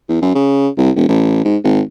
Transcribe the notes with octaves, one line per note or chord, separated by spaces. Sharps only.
E2
F#2
C#3
C2
E1
A1
G#2
G#1